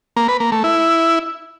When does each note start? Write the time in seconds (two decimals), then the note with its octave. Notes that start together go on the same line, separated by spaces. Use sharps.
0.17 A#3
0.28 B4
0.40 A#3
0.52 A3
0.64 E4